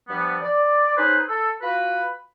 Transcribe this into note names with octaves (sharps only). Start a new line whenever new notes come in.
G2 F3 G3 B3
D5
C#4 D#4 G#4 B4 C5
A4
F4 F#4 B4